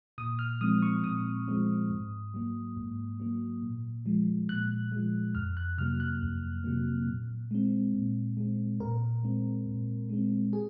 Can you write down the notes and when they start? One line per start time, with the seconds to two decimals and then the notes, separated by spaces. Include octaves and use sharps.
0.18 A#2 D#6
0.39 F6
0.61 F3 G#3 C4 D#6
0.82 C#6
1.04 A#2 D#6
1.48 F3 G#3 C4
1.90 G#2
2.34 F#3 A#3
2.77 G#2
3.20 F#3 A#3
3.63 A#2
4.06 F3 G#3
4.49 A#2 F#6
4.92 F3 G#3
5.35 F2 F6
5.57 F#6
5.78 C3 F#3 A#3 F6
6.00 F#6
6.21 F2
6.64 C3 F#3 A#3
7.07 A#2
7.51 G#3 C4
7.94 A#2
8.37 G#3 C4
8.80 A#2 A#4
9.23 G#3 C4
9.66 A#2
10.09 G#3 C4
10.53 G#4